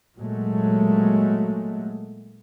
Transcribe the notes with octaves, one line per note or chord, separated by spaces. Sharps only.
A#2 F#3 G#3 A3